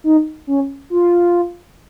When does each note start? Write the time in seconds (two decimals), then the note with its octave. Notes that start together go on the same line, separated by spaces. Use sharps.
0.04 D#4
0.47 C#4
0.90 F4